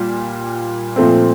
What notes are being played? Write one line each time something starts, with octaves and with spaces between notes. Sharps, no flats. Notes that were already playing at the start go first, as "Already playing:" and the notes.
Already playing: A#2 G3
A#2 F3 A3 C4